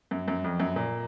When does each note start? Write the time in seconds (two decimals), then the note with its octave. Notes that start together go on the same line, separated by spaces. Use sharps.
0.11 F#2
0.28 F#2
0.44 F2
0.60 F#2
0.76 A#2